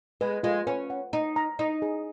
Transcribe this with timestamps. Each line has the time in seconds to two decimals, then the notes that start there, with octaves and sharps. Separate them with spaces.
0.21 G#3 B4
0.43 G#3 F4
0.67 C#4 B4
0.90 F#5
1.13 D#4 D#5
1.36 A#5
1.59 D#4 D#5
1.82 G#4